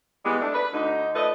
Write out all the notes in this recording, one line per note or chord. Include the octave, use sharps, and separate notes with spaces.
E3 G3 G#3 B3
A3 D4
B4
D2 D3 D#4
F3 A3 B4 D5 D#5